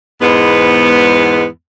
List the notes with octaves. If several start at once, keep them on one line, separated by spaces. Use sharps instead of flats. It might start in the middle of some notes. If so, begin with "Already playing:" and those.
E2 G#2 G#3 B3